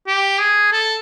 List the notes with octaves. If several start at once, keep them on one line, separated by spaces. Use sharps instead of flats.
G4
G#4
A4